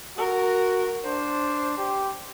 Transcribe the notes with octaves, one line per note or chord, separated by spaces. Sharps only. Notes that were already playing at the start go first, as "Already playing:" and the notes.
F#4 A#4
D4 C5
G4